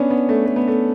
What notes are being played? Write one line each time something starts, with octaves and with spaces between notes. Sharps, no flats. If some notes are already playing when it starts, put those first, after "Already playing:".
Already playing: B3 C#4 D4
B3
A3
A3
B3
A3